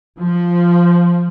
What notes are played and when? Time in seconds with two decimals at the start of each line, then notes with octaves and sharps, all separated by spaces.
0.19 F3